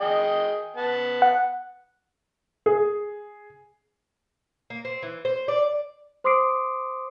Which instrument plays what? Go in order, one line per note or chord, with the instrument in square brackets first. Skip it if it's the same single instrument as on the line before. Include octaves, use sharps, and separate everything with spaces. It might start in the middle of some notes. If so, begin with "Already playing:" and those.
[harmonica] G#4 D#5 G5
B3 A5
[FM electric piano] F#5
[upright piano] G#4
[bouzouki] A#3
C4
E3
C5
D5
[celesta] C5 C6 D6 D#6 C7 D7